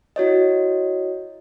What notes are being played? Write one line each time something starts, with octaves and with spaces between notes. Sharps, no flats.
E4 F#4 C#5 D#5